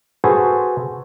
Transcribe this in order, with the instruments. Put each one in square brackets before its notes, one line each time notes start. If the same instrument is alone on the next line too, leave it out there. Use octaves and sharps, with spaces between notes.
[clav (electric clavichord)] F#4 G#4 A4 B4 C5 G#5